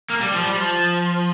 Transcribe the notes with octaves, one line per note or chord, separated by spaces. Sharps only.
A#3
G3
F3
G3
F3